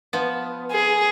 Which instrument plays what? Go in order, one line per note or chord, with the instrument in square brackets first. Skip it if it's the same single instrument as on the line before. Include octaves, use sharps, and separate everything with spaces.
[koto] F3 B3
[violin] G#4